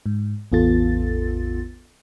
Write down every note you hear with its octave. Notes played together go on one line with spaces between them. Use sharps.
G#2
A1 E2 B3 F4 A4 A6